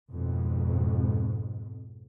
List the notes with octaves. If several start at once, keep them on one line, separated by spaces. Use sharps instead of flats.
F2 G#2 B2